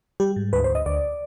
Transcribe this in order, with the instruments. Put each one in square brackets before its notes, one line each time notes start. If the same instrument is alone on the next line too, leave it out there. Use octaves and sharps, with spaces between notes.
[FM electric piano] G3 G4
G#2
D2 B4
C5
D2
D#5
D2 D5